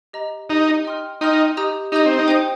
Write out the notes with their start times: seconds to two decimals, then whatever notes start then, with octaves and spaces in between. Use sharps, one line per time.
0.13 G4 D#5 A#5
0.50 D#4 G4 D#5 A#5
0.85 D#5 G5 C6 F6
1.21 D#4 D#5 G5 C6 F6
1.57 G4 D#5 A#5 D#6 G6
1.92 D#4 G4 D#5 A#5 D#6 G6
2.06 C4
2.19 D#4
2.28 C5 G5 D#6 G6